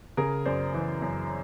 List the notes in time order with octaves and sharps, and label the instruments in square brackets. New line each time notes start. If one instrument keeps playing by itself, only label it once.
[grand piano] C#3 G#4 A#4
F#2 C5 D5
E3
F#2